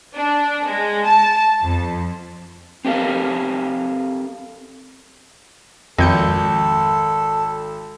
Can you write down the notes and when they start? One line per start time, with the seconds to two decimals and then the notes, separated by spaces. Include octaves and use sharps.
0.15 D4
0.65 G#3
1.04 A5
1.62 F2
2.85 C4 G4 A4 A#4 F5
5.99 G#1 F2 A4 G6 C#7